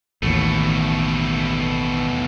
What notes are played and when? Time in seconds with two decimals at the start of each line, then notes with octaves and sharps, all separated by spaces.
0.23 A1 D#2 B2 A3